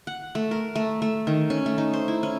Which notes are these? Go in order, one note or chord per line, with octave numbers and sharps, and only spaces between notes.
F#5
A3
A#4
A3
A3
D#3
C#4
A3
D#4
C5
E4
C#4